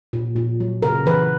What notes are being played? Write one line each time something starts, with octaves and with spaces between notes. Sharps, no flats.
A#2
A#2
F#3
C#3 A#4
E3 B4